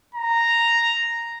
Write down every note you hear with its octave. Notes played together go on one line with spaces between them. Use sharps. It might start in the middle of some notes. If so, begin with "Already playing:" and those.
A#5